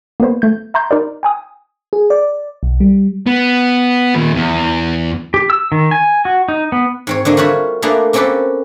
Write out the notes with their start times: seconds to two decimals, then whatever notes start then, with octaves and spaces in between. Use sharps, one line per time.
0.20 A#3 B3 B4 C5
0.42 A3 G6
0.74 E5 A#5 C6 G6
0.91 D#4 A#4 D5
1.23 G5 G#5 D#6
1.93 G#4
2.10 D5
2.63 B1
2.80 G3
3.27 B3
4.15 A#2 D#3
4.34 E2
5.34 G4
5.50 E6
5.72 D#3
5.91 G#5
6.25 F#4
6.48 D#4
6.72 B3
7.07 G#2 C4 C#5
7.25 D3 A#3 D4 D#5
7.37 G3 F4 F#4 C#5 E5
7.82 A3 A#3 D4 G#4 A4 B4
8.13 A#3 C4 C#4 G4 A4 B4